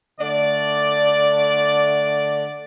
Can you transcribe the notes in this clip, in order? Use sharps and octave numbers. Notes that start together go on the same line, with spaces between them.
D3 A3 D5